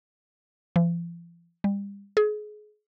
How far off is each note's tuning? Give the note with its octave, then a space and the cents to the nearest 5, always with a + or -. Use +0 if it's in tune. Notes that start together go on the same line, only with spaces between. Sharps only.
F3 -45
G3 +35
G#4 +30